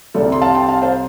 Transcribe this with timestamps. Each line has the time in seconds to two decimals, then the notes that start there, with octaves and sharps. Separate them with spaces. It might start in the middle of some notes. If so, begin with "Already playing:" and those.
0.14 C2 C3 G3 A4 D5
0.32 C6
0.41 F5 A5
0.55 G5 C6
0.68 F5 A5
0.82 C5 F5